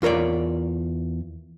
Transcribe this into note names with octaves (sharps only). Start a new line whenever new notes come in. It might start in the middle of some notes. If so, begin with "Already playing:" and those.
E2 F4 A#4 C#5 D5